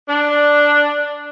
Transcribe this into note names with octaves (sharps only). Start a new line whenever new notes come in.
D4